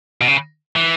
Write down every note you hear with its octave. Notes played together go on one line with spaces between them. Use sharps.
B2
C#3
E3